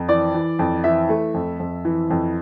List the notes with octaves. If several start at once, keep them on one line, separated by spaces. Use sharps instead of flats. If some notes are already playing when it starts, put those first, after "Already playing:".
Already playing: F2
E3 D5
E3
F2
E3 E5
A3
F2
F2
E3
F2